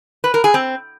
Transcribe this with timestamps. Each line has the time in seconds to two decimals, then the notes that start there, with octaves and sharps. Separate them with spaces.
0.24 B4
0.34 A#4
0.44 G#4
0.54 C4